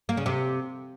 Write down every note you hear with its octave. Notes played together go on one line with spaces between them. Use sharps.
A#3
C#3
C3